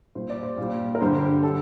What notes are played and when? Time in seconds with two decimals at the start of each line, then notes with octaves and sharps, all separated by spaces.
0.15 A#2 G3 C5
0.30 D5
0.43 C5
0.58 A#2 G3
0.95 A#4
1.01 G2 D3 G3 C5
1.43 D3 A4